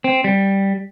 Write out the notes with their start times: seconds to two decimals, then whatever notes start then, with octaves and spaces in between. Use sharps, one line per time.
0.04 C4
0.24 G3